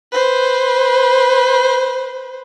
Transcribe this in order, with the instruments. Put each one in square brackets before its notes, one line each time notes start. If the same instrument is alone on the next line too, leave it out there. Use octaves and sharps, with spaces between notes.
[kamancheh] B4 C5